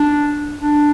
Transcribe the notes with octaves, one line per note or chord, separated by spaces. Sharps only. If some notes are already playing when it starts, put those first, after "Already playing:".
Already playing: D4
D4